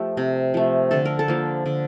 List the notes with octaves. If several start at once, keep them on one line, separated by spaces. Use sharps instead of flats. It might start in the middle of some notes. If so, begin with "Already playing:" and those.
Already playing: F3 A3 G4
C3
F3 A3
D3 A4
A#4
A4
F3 A#3
D3